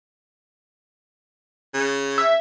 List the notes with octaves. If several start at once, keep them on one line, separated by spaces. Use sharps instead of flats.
C#3
E5